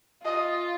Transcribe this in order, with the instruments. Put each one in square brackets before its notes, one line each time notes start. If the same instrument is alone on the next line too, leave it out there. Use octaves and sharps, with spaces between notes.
[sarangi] F4 [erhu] D#5